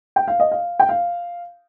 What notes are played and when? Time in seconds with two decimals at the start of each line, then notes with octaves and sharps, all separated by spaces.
0.16 G5
0.28 F5
0.40 D#5
0.52 F5
0.79 G5
0.89 F5